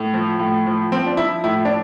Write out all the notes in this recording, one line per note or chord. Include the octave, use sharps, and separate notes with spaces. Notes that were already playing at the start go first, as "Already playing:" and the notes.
Already playing: A2
F3
A2
F3
F3 C4
D4
F3 E4
A2 E4
D4